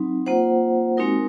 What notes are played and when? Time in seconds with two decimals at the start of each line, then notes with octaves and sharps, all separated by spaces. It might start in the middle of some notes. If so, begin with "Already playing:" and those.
Already playing: F#3 C4 D#4
0.26 A#3 F4 C5 F#5
0.97 G#3 C4 D#4 F#4 A#4